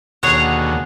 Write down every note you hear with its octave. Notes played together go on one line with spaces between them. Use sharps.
D#2 B2 D3 G#4 C#5 F#5